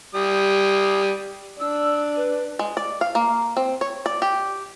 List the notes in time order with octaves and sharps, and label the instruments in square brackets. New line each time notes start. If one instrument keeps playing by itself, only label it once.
[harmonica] G3 D#6
[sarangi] D4 [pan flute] E6
[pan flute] B4
[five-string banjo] G#3
D5
F5
A#3
C4
C#5
D5
G4